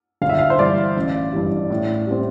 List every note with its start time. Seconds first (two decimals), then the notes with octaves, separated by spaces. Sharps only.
0.22 G1 F5
0.29 E5
0.39 F5
0.50 C5
0.59 G2 E3 D5
0.97 A1
1.33 G2 E3 G3
1.70 A2
2.07 G3 C4